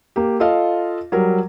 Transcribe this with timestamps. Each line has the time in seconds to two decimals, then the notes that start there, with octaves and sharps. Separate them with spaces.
0.16 A#3 G4
0.40 F4 A4 D#5 F5
1.12 F#3 G3 A#4